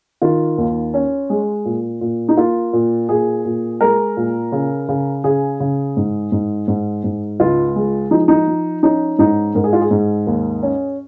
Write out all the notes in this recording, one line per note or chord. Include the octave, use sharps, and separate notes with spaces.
D#3 F4
D#2
C#4
G#3
A#2
A#2
D#4
A#3 F4
A#2
A#2 G#4
A#2
G#3 A#4
A#2
C#3
C#3
C#3 G#4
C#3
G#2
G#2
G#2
G#2
C#2 F4
G#3
F3 D#4
D#4
F3
C#4 D#4
G#2 D#4
G#2 A#4
G#4
F4
G#4
G#2
D#2
C#4